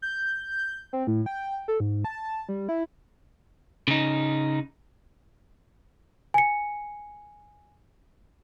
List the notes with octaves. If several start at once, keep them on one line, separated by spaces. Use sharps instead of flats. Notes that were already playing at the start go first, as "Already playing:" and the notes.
G6
C4
A2
G5
A4
G#2
A5
G3
E4
C#3 D#4
G#5 C#7